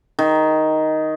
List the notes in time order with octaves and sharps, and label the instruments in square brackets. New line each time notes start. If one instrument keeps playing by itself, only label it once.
[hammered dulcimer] D#3